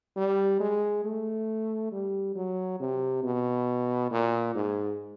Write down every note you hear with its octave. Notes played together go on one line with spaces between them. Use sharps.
G3
G#3
A3
G3
F#3
C3
B2
A#2
G#2